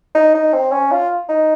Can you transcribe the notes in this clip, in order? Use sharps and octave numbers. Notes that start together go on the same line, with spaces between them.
D#4
D#4
C4
C#4
F4
D#4